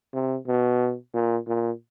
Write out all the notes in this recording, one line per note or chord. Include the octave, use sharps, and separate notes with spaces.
C3
B2
A#2
A#2